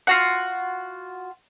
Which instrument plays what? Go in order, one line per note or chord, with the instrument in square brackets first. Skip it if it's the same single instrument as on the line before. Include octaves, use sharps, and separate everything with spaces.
[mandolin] F4 F#4 F#5